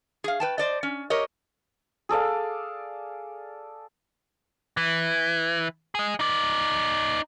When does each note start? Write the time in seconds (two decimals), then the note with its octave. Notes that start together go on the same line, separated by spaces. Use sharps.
0.24 G#4 F5
0.40 B4 G5 A5
0.58 C5 D5 D#5
0.83 C#4
1.10 G4 A#4 C#5 D#5
2.09 G#4 A4 D5 F5
4.77 E3
5.95 G#4 D#5
6.20 D#4 D5